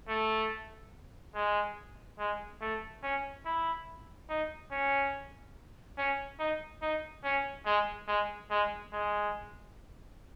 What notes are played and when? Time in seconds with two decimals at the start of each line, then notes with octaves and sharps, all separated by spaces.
0.08 A3
1.35 G#3
2.19 G#3
2.61 A3
3.03 C#4
3.45 E4
4.29 D#4
4.71 C#4
5.98 C#4
6.39 D#4
6.82 D#4
7.24 C#4
7.66 G#3
8.07 G#3
8.50 G#3
8.92 G#3